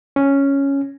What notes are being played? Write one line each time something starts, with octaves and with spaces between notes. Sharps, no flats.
C#4